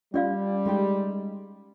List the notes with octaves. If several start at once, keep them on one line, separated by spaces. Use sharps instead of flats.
G3 C#4 F4 D5 F5
G#3 D#4 G4